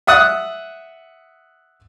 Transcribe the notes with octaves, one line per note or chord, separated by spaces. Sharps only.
E5 F#5 D#6 F#6